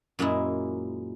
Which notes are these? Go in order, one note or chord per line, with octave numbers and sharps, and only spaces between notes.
F#2 A#2 G#3 A#3 E4